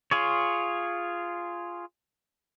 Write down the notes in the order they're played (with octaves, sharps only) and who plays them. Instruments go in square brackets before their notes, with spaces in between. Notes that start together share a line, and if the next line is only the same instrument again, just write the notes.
[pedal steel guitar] F4 G#4 C#5